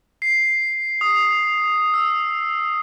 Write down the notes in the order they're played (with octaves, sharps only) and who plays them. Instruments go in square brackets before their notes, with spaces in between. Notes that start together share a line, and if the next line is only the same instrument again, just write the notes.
[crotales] C7
D#6
E6